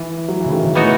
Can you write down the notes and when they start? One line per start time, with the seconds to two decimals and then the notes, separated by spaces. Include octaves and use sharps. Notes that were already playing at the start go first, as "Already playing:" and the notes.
Already playing: E3
0.28 F#3
0.41 E3
0.46 C#3
0.52 D#3
0.64 C#3
0.76 A2 E3 B3 D#4 F#4